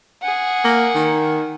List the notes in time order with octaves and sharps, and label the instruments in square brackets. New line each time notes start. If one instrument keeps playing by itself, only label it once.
[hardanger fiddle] G#4 F#5
[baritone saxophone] A#3
D#3